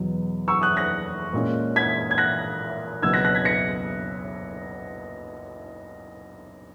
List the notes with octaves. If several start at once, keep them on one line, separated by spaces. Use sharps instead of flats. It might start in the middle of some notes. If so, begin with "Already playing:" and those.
Already playing: E2 B2 F#3
C#6 E6
D#6 F#6
F#6 A#6
A#2 G#3 C#4
G#6 B6
G#6
F#6 A#6
C#2 B2 F#3 E6 G#6
F#6 A#6
F#6 A#6
G#6 B6
A#6 C#7